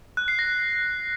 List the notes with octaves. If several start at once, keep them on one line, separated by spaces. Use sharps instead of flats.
F#6
C7
A#6